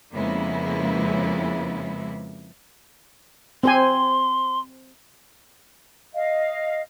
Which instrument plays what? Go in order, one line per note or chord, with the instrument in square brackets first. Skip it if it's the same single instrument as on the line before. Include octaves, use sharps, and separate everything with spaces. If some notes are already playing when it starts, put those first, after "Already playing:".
[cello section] F2 C#3 G#3 A#3 B3 E4
[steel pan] C4 C5 G#5 [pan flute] C6
[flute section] D#5 F5